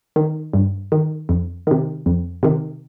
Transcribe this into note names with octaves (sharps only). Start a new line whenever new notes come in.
D#3
G2
D#3
F2
C3 D#3
F2
C3 D#3